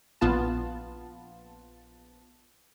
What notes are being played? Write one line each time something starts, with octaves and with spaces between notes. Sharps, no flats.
A#1 B3 F4 A5